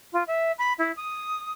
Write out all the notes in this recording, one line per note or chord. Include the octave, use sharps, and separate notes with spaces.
F4
E5
B5
E4
D#6